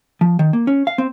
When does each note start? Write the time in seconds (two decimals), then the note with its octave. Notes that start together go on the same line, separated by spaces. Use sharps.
0.21 F3
0.39 D#3
0.53 A#3
0.67 C#4
0.87 F5
0.98 C4